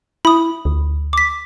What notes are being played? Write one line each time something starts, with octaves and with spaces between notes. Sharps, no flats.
E4 B5 D#6
D2
D6 B6